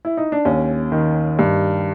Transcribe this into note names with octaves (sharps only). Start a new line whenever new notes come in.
E4
D#4
D4
D#2 C#4
D#3
G2